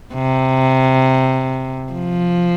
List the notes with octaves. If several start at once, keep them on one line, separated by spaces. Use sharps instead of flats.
C3
F3